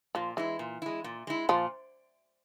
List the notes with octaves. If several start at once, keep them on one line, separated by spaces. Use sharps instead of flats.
A#2 F3
E3 G#3 E4
A#2
G#3 E4
A#2
G#3 E4
A#2 F3